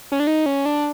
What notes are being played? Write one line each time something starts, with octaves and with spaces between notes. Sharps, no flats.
C#4
D4
D#4
C#4
D4